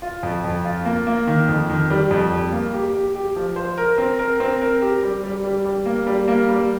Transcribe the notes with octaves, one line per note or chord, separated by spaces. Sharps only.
F4
F2
F2
F4
A#3
A#3
D#3
F2
D#3
G3
F2
G3
A#3
G4
G4
G4
F3
C5
A#4
C4
A#4
C4
A#4
G4
G3
G3
G3
G3
A#3
G3
A#3
G3